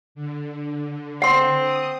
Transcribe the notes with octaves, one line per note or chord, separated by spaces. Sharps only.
D3
C4 F#5 C6
D#6